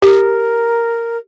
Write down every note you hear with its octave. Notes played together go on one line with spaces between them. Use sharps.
G4 A#4